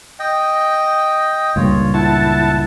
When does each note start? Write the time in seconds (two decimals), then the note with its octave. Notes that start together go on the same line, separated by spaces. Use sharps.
0.19 D#5 G5
1.56 C#2 G2 A#2 F4 C#5
1.94 E4 F#5 A5